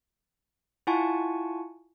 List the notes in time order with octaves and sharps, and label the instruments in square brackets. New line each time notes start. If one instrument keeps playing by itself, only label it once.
[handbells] E4 F4 F#5 G#5 A5 C#6